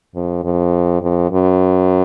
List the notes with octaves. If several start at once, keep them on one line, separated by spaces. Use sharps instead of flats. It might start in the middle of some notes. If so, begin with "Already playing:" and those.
F2
F2
F2
F#2